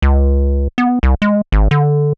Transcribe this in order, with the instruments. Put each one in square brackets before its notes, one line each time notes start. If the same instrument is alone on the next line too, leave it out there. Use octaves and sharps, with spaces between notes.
[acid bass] C#2
B3
C2
G#3
G#1
D3